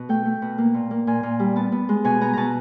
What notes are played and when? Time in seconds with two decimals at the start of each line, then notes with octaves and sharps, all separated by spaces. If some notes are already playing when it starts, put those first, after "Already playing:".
Already playing: B2
0.09 A3 G5
0.25 A3
0.42 B2
0.58 A#3
0.74 A#2
0.91 A#3
1.07 A#2 G#5
1.23 A#2
1.40 G3
1.56 B3 A5
1.72 B3
1.89 G#3
2.04 B2 G#5
2.21 B3 A#5
2.33 B2 A5 A#5